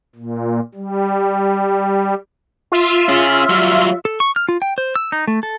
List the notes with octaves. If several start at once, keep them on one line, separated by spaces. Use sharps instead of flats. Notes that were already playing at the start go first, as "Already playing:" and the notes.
A#2
G3
F4 E5
C#4 G#4
F#3 G3
A4
C#6
F6
F4
G5
C5
E6
D#4
A3
A4